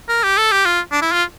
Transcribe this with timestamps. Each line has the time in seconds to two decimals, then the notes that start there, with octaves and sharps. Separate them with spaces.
0.09 A#4
0.23 G4
0.38 A4
0.52 G4
0.65 F4
0.91 D4
1.02 E4
1.12 F4